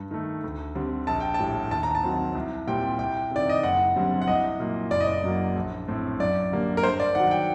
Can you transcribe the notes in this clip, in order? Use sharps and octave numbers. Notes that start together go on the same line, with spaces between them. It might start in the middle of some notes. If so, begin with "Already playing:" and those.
Already playing: G2
D#3 A3
D2
D3 G3 C4
A#1 A5
G5
A5
A2 G3
D#2 A5
A#5
A5
D#3 F#3 C4
C2
A#2 G3 C4 G5
C2 G5
C3 D#3 D5
D#5
F#1 F#5
F#2 D3 G3 C4
F#5
C2 D#5
A#2 F#3 A#3
F#1 D5
D#5
D5
F#2 F#3 A#3
A#1
A2 A3 C4
F#2 D5
D3 G3 A#3
A#4
G2 C5
D5
D#3 F#3 F#5
F#5
G5